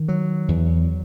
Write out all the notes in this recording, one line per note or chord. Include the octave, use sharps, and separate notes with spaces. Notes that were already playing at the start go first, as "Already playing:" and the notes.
Already playing: D#3
F#3
E2